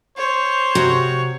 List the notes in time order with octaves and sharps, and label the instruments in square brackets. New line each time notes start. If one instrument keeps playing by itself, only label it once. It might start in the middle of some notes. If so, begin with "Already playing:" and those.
[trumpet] C5 [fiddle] C#5
[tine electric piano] C3 C4 [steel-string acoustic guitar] F#4 A#5